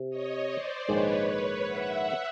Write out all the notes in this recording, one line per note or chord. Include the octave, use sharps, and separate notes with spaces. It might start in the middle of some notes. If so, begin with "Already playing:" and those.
Already playing: C3
C#5 D#5
C5 D5
A#1 G#2 D#3 G#3 B4 C#5
B4 C#5
E5 F#5